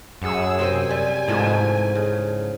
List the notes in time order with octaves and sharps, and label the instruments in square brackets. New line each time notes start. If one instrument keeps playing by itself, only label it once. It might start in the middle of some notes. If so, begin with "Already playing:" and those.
[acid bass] F#2 [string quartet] G#4 F#5 E6
[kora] C3 C4 C5 [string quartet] G#5
[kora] G3
[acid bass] G#2 [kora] E3 F3 A3
[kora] C#3